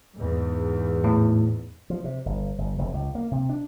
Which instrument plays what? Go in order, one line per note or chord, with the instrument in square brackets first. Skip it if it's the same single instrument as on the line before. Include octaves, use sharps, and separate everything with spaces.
[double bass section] E2 G#2
[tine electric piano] A2
[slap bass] F3
C3
G1
G1
F1
C#2
A#3
C3
D4